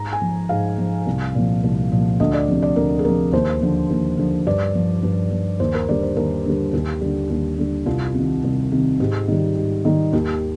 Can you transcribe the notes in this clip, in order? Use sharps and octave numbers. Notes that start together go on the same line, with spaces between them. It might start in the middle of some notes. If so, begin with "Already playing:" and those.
Already playing: G#2 A#5
G#5
F3
G#2 F5
F3
C2
A#2 F3
C2
A#2 F3
D2 D#5
D5
C3 F3
D5
D2 A#4
G#4
C3 F3 A#4
D#2 C5
D3 F3
D#2
D3 F3
G2 D5
F3
G2
F3
D#2 C5
A#4
D3 G3 D5
C5
D#2 A#4
D3 G3
D#2 G4
D3 G3
D#2
D3 G3
C2 F4
C3 D#3
C2
C3 D#3
G#2 G4
D#3 G3
G#2
D#3 G3
D#2 G4